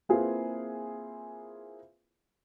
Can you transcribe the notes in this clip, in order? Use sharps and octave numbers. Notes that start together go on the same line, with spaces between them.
A#3 C4 E4 F4 G#4 B4